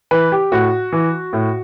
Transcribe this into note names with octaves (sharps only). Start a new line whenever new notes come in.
E3 B4
G4
A2 F#4
E3
A2